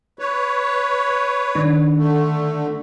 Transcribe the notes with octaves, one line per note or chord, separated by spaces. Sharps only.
B4 C#5
D#3 D4
D3 A3